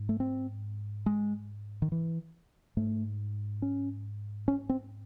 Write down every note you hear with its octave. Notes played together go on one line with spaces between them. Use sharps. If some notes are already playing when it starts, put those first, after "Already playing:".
Already playing: G#2
A3
C4
G#3
D#3
E3
G#2 A3
C#4
C#4
C4